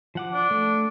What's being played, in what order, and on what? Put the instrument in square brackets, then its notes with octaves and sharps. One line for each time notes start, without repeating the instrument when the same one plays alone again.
[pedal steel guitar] F3 F#5 D6
[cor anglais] D4
[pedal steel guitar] A3